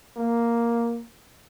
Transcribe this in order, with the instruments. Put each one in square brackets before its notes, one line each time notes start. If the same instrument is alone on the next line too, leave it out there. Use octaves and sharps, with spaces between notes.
[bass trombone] A#3